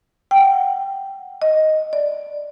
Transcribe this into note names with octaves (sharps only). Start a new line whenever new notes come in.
G5
F#5
D#5
D5